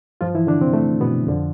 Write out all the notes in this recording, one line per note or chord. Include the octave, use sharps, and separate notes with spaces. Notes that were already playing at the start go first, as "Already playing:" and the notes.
G2 F3 F4
E3 E4
D3 D4
C3 C4
A3
B2 B3
F2 D3 F3